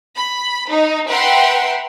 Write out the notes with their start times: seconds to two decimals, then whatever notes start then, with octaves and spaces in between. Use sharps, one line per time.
0.17 B5
0.68 D#4
1.08 B4 E5 F#5 G5 A#5 C6